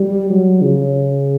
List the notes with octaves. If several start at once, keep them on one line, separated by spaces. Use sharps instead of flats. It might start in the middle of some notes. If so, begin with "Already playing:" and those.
Already playing: G3
F#3
C#3